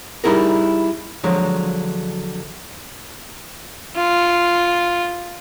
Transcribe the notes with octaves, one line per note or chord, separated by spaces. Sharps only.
G3 D#4 E4 G#4 A#4
D3 F3 F#3 G#3
F4